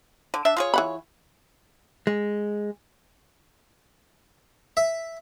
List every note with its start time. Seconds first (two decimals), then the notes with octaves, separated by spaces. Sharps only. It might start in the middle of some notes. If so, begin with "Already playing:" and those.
0.34 D3
0.45 D4 E5
0.56 F4 G#4 C#5
0.74 E3 F#5 B5
2.07 G#3
4.77 E5